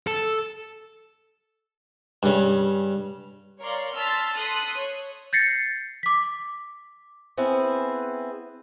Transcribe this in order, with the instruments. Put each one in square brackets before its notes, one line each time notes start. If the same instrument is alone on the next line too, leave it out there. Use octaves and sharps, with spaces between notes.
[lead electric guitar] A4
[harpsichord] G2 C#3
[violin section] A#4 C#5 D5 F5 C6
A5 C6 E6 F6 A6 B6
A4 C6 D#6 F#6 B6
C#5
[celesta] G6 A6 A#6 C7 C#7
D6 B6
[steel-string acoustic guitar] B3 C4 E4 G#4